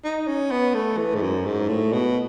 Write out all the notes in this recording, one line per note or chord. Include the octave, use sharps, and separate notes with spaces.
D#4
C#4
B3
A3
E3
G#2
F#2
G#2
A2
B2